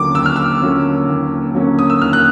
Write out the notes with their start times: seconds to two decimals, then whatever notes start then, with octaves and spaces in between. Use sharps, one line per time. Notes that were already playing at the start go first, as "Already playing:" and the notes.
Already playing: D#2 D3 F#3 A#3 C#4 D6
0.14 D#2 E6
0.26 F6
0.36 E6
0.62 D3 F#3 A#3 C#4
1.08 D#2
1.54 D3 F#3 A#3 C#4
1.79 D#6
1.90 E6
2.02 D#2 F6
2.13 F#6